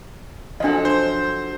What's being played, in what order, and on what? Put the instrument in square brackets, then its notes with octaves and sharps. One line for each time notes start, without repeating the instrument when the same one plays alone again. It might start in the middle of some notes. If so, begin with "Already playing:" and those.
[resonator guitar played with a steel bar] F3 F#3 A4 [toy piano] D4 D#5
[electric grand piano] C5